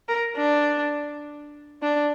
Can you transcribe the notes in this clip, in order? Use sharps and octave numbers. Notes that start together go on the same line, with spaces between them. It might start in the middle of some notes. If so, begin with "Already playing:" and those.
A#4
D4
D4